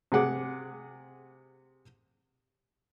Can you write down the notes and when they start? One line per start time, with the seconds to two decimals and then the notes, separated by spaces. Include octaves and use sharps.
0.12 C3 G#4 F#5 D6